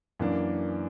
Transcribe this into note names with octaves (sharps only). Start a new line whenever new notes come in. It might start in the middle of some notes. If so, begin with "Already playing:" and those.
F#2 E3 A#3 D4